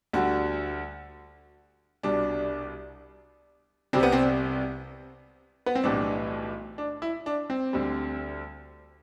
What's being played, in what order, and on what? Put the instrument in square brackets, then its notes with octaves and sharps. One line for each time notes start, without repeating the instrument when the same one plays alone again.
[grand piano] D2 D3 G3 F#4
C2 B2 G3 D4
C2 C3 G3 C4
B3
C4
B3
C4
B1 A2 E3 G3 D4
D4
E4
D4
C4
D2 D3 G3